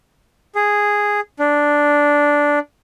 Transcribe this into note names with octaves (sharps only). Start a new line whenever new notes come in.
G#4
D4